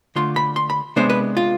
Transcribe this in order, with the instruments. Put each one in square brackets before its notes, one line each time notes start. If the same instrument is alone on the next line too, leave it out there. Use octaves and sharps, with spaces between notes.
[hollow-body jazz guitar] D3 A3 D4 F4 C6
B5
C6
B5
C3 G#3 B3 D4 C5
B4
F4